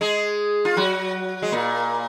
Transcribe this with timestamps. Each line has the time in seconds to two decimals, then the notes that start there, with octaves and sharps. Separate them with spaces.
0.01 G#3 G#4
0.65 F4
0.77 F#3 F#4
1.42 G#3
1.52 A#2 A#3